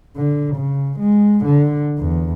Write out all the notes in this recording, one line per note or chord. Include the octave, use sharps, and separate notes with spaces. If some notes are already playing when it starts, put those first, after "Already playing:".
D3
C#3
G#3
D3
E2